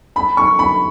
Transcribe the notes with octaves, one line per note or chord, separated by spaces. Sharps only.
B5
C#6
B5